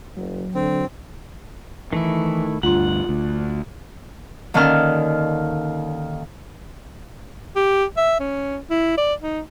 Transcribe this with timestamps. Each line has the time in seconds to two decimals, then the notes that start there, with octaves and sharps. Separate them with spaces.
0.16 F#1 F#3
0.55 D3 C4
1.93 D#3 E3 A3 E4
2.63 D2 G2 F4 F#5 C6
3.09 D2
4.54 D#2 D3 D#3 C#4 A5 F6
7.56 G4
7.97 E5
8.20 C#4
8.70 E4
8.98 D5
9.22 D#4